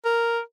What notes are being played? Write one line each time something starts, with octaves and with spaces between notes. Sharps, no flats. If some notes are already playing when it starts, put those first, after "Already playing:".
A#4